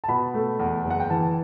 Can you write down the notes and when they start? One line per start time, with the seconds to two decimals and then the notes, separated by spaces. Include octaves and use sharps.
0.04 A5
0.08 B2 B5
0.34 A3
0.59 E2
0.85 F#1
0.90 F#5
1.00 G5
1.10 E3 A5